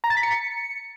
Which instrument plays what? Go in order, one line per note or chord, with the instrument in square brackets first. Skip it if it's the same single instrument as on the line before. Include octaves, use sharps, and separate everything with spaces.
[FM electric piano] A#5
A6
B6
C#7